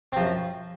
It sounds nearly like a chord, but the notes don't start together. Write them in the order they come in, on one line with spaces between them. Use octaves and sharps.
C4 F3 F#2